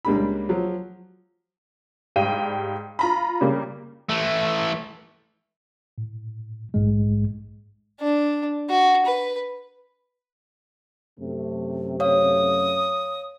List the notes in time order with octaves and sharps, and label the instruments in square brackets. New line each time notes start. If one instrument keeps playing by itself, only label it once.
[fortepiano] C#2 G3 A#3 D4 G4 B5
F3 F#3
[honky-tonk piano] G#2 G3 F5 G5 D#7
F4 A#5 B5
C#3 G3 A#3
[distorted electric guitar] E3 A3
[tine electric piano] A2
A#1 G#2 G#3
[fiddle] D4
F#4
B4
[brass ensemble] F#2 A3 [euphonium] C3
[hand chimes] C#5 F5 [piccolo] D#6